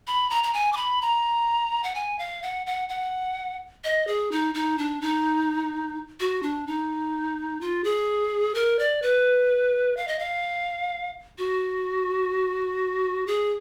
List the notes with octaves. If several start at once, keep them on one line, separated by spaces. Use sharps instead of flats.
B5
A#5
A#5
G#5
D6
B5
A#5
F#5
G#5
F5
F#5
F#5
F#5
D#5
G#4
D#4
D#4
D4
D#4
F#4
D4
D#4
F4
G#4
A#4
D5
B4
F5
D#5
F5
F#4
G#4